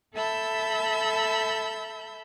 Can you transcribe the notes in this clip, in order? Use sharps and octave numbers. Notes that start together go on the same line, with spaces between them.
A4 E5 A5 B5 E6 G6